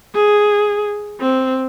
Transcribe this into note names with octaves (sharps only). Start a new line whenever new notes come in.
G#4
C4